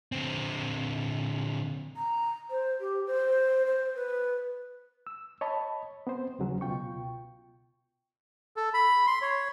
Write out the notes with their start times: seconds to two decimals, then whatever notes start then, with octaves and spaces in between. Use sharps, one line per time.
0.12 D3 C4
1.97 A#5
2.50 C5
2.80 G4
3.06 C5
3.66 C5
3.95 B4
5.07 E6
5.41 C#5 D#5 A5 B5
6.07 B3 C4 B4 C5
6.39 D#2 C#3 F#3 C#4
6.61 C#2 B2 F4 G5 C#6
8.56 A4
8.74 B5
9.07 C6
9.22 C#5